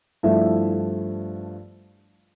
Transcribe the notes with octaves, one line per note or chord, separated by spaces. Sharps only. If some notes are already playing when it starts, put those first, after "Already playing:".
G2 F3 A3 E4 E5